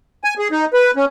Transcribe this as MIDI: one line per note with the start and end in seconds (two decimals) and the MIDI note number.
0.24 0.34 80
0.39 0.48 68
0.52 0.65 63
0.73 0.91 71
0.96 1.05 61